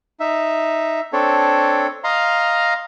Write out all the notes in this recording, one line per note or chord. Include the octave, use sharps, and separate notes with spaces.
D#4 E5
C4 D4 A4 C#5
D#5 F5 A#5 C6